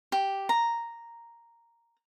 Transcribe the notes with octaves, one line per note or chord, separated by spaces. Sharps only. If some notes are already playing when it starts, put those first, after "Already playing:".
G4
A#5